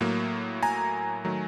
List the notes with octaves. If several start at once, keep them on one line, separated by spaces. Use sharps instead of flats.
A2 F#3 A#3
G#5 A#5
D#3 F#3 A3